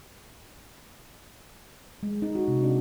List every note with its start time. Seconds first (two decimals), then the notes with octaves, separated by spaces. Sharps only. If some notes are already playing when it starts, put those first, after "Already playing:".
2.03 G#3
2.22 D#4
2.35 F#4
2.48 C3
2.63 D4